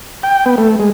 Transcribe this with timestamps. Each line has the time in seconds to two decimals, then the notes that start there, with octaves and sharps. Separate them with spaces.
0.23 G5
0.46 B3
0.58 A3
0.80 G#3